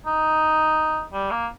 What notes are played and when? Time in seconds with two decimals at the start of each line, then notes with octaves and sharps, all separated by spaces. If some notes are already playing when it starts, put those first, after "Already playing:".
0.06 D#4
1.13 G3
1.31 A#3